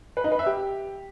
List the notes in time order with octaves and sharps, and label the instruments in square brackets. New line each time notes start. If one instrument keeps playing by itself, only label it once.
[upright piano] B4
D#4
B4
E5
G4